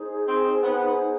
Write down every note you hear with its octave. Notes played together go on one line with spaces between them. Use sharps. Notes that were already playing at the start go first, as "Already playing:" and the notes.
Already playing: D#4 G#4 C5
C4
B3